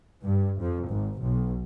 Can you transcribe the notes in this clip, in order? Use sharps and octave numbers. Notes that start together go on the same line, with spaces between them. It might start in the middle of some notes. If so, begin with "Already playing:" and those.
G2
F2
G#1
B1